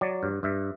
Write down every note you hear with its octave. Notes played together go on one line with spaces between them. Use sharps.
F#3 D5
G2
G2 E5